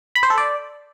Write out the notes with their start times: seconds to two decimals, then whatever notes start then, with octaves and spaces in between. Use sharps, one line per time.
0.15 B5
0.23 C5
0.30 A4
0.38 D5